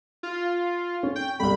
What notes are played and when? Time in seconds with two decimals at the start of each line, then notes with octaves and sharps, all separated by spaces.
0.23 F4
1.03 C#4
1.16 G5
1.40 G1 C2 B5